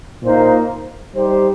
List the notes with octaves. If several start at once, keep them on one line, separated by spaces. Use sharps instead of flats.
A#2 A#3 D#4 C5
G3 D#4 G4 C5